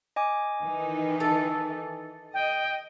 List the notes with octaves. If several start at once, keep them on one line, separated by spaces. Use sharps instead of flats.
D#5 G#5 D6
D#3 E3 D#4
A4
D#5 G5